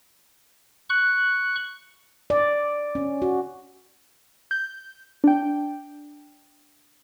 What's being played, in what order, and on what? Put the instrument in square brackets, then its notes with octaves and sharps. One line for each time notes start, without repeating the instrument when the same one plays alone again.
[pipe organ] C#6 F#6
[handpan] D5
C#4
F#4
[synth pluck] G6
D4 G5